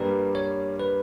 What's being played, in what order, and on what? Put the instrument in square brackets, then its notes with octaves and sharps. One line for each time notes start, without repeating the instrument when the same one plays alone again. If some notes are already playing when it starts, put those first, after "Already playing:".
Already playing: [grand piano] G2 G3 A#3 [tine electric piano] B4
[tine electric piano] C#5
B4